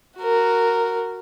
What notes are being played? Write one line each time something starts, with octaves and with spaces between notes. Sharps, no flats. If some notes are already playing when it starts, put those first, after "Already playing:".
F#4 A#4